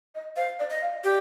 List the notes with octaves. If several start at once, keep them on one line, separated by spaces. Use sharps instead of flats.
D#5
C5 F5
D5
D#5
F5
G4 D5